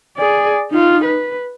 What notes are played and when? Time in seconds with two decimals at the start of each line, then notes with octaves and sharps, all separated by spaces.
0.17 G#4 D5
0.70 D#4 F4
1.05 B4